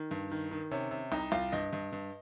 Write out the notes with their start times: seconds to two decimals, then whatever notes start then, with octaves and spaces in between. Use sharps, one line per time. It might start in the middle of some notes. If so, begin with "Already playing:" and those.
Already playing: D#3
0.11 G2
0.31 D#3
0.51 D#3
0.71 C3 C#4
0.91 C3
1.12 C2 D#4
1.32 C2 F4
1.52 G2 D#5
1.73 G2
1.93 G2